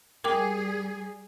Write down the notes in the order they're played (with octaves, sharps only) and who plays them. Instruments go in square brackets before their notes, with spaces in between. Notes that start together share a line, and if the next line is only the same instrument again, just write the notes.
[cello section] G3 G#4 [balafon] A#4 G5 D6